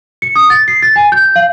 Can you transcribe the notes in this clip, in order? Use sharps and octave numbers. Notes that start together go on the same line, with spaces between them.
C#7
D#6
A6
C7
A6
G#5
G6
F5